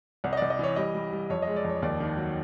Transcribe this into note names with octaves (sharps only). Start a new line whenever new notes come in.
C2 F#5
D#5
D5
C2
D#5
E3 C#5
G3 D#5
G3
G3
F2 C#5
D#5
G#3
D5
F2 C#5
D#2 D5
D#3
F#3